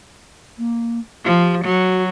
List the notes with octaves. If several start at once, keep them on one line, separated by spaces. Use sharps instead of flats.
A#3
F3 G4
F#3 F#4